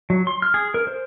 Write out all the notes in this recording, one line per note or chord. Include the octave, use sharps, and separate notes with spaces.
F#3
C6
F6
G#4
A#4
C5